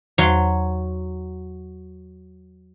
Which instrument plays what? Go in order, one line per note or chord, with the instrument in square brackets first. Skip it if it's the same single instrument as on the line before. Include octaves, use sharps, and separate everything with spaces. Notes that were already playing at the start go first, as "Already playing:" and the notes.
[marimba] E2 [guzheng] F#3 C6